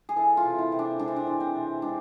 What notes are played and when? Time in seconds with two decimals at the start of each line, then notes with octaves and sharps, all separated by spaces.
0.09 G#4
0.16 E3 A4
0.37 F4
0.44 C3
0.59 E4
0.72 C3 C4
0.79 D4
0.99 G#3 D4
1.08 C4
1.16 D4
1.27 E3
1.40 C4
1.55 C3
1.82 G#3 D4